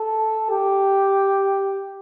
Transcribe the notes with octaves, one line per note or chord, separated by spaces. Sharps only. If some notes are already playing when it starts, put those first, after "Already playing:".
Already playing: A4
G4